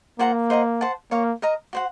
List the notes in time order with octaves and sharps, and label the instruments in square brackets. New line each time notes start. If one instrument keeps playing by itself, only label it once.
[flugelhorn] A#3 [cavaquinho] F4 C5 F#5 A#5
[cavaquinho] C5 D#5 F#5 A#5
C5 F#5 A5
[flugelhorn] A#3 [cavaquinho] C#5 F5 A#5
[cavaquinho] A#4 D#5 A#5
F#4 C5 F#5